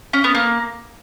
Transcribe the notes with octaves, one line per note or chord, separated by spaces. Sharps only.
C#4
B3
A#3